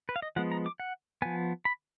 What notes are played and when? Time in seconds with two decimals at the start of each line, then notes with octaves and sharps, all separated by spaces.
0.09 B4
0.16 F5
0.22 D#5
0.36 F3 G#3 B3 F#5
0.52 A#5
0.66 D6
0.80 F#5
1.22 F3 B3 G#5
1.65 B5